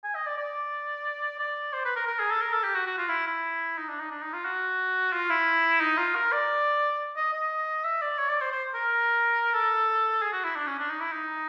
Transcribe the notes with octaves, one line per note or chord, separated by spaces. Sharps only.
G#5
D#5
D5
D5
D5
C5
B4
A#4
A#4
G#4
A4
A#4
A4
G4
F#4
F#4
F4
E4
E4
D#4
D4
D#4
D4
D#4
F4
F#4
F4
E4
D#4
F4
A#4
D5
D#5
D#5
E5
D5
C#5
D5
C5
C5
A#4
A4
G#4
F#4
E4
D4
C#4
D4
D#4
E4
D#4